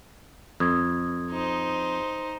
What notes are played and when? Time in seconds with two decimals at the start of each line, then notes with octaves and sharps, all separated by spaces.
0.60 F2 D#6 G#6
1.31 D#4 C5